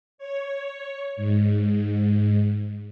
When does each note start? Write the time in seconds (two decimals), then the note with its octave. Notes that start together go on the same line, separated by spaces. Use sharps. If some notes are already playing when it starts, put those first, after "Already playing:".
0.18 C#5
1.17 G#2